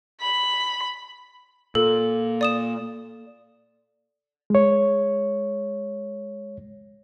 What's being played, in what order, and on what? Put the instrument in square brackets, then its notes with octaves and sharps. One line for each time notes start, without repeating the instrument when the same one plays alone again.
[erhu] B5
[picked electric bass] A#2 [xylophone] A4
[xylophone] D5 D#6 E7
[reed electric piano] G#3 C#5